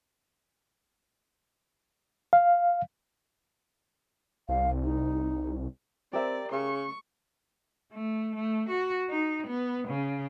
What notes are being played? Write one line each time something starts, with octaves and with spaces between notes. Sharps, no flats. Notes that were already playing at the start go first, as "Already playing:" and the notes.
F5
C2 F5
D#4
C4 G4 A#4 D5 E5
C#3 C#6
A3
A3
F#4
D#4
B3
C#3